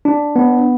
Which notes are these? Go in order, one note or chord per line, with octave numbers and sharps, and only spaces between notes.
D4
B3